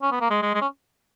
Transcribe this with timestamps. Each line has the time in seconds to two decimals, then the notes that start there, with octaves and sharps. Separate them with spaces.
0.02 C#4
0.12 B3
0.21 A#3
0.31 G#3
0.43 G#3
0.55 G#3
0.61 C#4